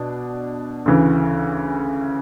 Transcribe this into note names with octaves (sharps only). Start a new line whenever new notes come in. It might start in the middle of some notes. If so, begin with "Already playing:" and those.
Already playing: B2 D4
D2 C#3 E3